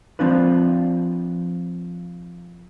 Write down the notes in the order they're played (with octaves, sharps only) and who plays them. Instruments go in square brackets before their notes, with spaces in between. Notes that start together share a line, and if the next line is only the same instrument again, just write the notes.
[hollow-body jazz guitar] F3 C4 D4 F4 B4